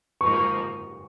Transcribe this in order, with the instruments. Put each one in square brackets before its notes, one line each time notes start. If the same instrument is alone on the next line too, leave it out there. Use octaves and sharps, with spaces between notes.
[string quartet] G#2 F3 A#3 D#4 [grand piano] C#6
[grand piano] C#6